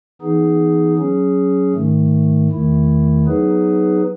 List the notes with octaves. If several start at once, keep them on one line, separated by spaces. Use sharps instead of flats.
E3 B3 D#4 G#4
F#3 C#4 G#4
G#2 D#3 A3
E2 D#3 A3 E4
F#3 B3 D#4 G#4 B4